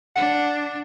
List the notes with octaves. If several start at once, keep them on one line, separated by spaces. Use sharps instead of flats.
D4 F#5